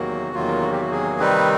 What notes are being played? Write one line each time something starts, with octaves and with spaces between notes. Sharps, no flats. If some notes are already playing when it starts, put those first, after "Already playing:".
Already playing: E2 C3 D#3 F#3 A#3 F#4
E2 C3 D#3 F#3 A#3 F4
F#4
G4
F#4
G#4
C3 D#3 G3 C4 D#4 B4